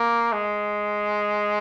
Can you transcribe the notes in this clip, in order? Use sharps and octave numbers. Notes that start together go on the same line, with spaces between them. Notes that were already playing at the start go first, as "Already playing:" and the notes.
Already playing: A#3
G#3